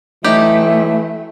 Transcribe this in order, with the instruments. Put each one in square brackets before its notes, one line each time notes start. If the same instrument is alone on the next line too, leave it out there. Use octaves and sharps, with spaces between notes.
[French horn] E3 [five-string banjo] F#3 D#4 G4 [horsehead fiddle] A3 [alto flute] E5